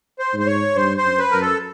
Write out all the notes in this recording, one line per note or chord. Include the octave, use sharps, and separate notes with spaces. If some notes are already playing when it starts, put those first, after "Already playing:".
C5
G#2
C5
C#5
G2 C5
C5
F#2
B4
F#2 A#4
A4